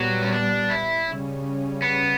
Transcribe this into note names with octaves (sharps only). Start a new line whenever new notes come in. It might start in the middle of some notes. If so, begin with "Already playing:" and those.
Already playing: A#2 F#3 G3 B3
C#4
D4
E4
C#3 G3 C#4
B3